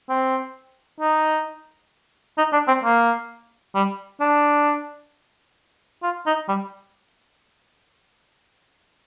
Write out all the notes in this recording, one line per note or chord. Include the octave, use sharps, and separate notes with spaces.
C4
D#4
D#4
D4
C4
A#3
G3
D4
F4
D#4
G3